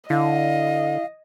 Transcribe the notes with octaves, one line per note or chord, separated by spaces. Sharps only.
D3 E4 D#5 F5